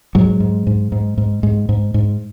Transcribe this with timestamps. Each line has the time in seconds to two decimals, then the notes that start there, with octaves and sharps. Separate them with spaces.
0.15 G#2 F#3 G#3
0.40 G#2
0.67 G#2
0.92 G#2
1.18 G#2
1.43 G#2
1.69 G#2
1.94 G#2